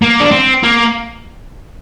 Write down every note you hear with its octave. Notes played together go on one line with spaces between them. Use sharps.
A#3
D4
C4
A#3